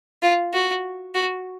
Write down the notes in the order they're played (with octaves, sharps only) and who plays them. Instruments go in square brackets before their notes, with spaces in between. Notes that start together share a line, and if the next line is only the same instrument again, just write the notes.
[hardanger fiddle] F4
F#4
F#4